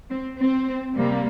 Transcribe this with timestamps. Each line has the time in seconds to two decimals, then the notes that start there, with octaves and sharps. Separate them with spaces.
0.10 C4
0.38 C4
0.94 C3 G3 A#3